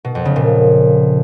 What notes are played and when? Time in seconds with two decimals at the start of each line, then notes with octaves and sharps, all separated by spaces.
0.05 B2
0.15 F2
0.25 C#3
0.36 A#2